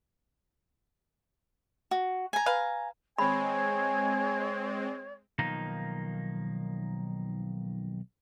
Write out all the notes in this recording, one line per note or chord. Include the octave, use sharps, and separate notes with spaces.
F#4
G#5 A#5
B4 F5
G#3 C4 C#5 G#5 B5
B1 D#3 F3 A#3 D#4